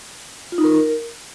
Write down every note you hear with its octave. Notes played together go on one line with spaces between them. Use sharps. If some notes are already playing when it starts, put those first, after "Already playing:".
F4
D#4
A#4